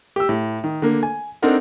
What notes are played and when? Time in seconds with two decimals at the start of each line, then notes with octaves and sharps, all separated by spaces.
0.16 G4 E6
0.29 A2
0.64 D#3
0.82 D3 A#3
1.03 G#5
1.42 C4 D4 D#4 A4 A#4 F#5